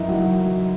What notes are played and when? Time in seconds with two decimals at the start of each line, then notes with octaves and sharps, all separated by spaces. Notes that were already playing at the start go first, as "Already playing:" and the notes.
Already playing: F#2 E3 D#4 E4
0.08 F#3 F#4